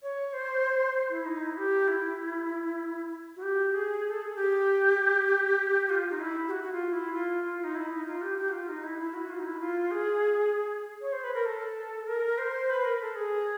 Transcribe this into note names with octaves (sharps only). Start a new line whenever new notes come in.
C#5
C5
E4
D#4
E4
G4
E4
F#4
G4
G#4
A4
G#4
G4
F4
D#4
E4
G4
F#4
F#4
F4
E4
F4
F4
D#4
E4
D#4
F4
G4
G4
F#4
F4
D#4
E4
E4
F#4
F4
D#4
E4
F4
G#4
C#5
C5
B4
A#4
A4
A#4
C5
B4
A#4
A4
G#4